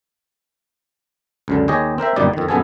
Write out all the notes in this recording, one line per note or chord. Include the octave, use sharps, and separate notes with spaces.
C#2 F#2 D3
D#2 G4 G#4 C#5 D#5
C4 A#4 C5 E5
G1 F#2 A#2 G3 D#4 D5
F2 D#3
A#1 F#2 B3 G#4 A4 G#5